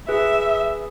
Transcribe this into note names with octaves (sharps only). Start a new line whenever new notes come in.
G#4 B4 E5